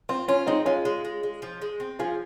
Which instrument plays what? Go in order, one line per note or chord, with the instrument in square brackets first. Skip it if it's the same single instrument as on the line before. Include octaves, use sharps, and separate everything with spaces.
[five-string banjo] C4 [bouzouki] F4
[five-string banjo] C#4 [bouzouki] F4
[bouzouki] G#3 [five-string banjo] C4 D#4
[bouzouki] G#3 [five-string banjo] C#4 F4
[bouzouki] G#3
G#3
G#3
F3
G#3
C4
[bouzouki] F3 [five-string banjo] F4 G#4